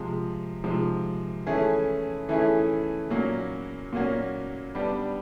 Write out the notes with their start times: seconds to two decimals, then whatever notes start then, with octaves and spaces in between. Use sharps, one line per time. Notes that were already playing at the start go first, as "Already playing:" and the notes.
Already playing: C3 F3 G#3
0.64 C3 F3 G#3
1.47 E3 A3 C#4 E4 G#4
2.29 E3 A3 C#4 E4 G#4
3.11 A#2 F#3 A#3 C#4 F#4
3.93 A#2 F#3 A#3 C#4 F#4
4.75 G3 B3 D4 G4